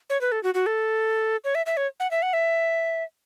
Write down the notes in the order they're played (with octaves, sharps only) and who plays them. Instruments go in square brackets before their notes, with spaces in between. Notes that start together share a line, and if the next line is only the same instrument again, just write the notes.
[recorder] C#5
B4
A4
F#4
F#4
A4
C#5
E5
E5
C#5
F#5
E5
F#5
E5